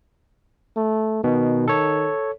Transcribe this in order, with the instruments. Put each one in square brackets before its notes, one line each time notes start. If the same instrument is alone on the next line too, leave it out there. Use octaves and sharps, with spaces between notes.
[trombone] A3
[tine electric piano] B2 [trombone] D#3
[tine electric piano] A4 C#5